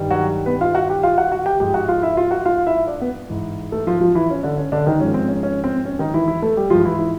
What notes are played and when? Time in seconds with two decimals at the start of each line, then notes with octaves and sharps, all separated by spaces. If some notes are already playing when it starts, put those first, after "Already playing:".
Already playing: G2 D#3 G3
0.11 F#3 F#4
0.46 B3 B4
0.61 F4 F5
0.75 F#4 F#5
0.89 G4 G5
1.03 F4 F5
1.18 F#4 F#5
1.31 F#4 F#5
1.46 G4 G5
1.60 G#2 F3 G#3 G4 G5
1.74 F#4 F#5
1.88 F4 F5
2.02 E4 E5
2.17 F4 F5
2.31 F#4 F#5
2.45 F4 F5
2.67 E4 E5
2.87 D4 D5
3.01 B3 B4
3.30 G#2 E3 G#3
3.72 A3 A4
3.87 F3 F4
4.01 F3 F4
4.15 E3 E4
4.30 C#4
4.43 D3 D4
4.58 C#4
4.72 D3 D4
4.86 D#3 D#4
5.00 G#2 F3 G#3 C#4
5.14 C4
5.28 C#4
5.43 C#4
5.64 C4
5.85 C#4
5.99 D#3 D#4
6.14 E3 E4
6.28 E3 E4
6.42 A3 A4
6.57 G3 G4
6.70 G#2 E3 F3 G#3 F4
6.85 E3 E4
6.98 E3 E4